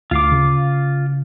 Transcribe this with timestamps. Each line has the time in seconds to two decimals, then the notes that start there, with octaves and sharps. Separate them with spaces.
0.11 D2 F4 F5 D6
0.32 C#3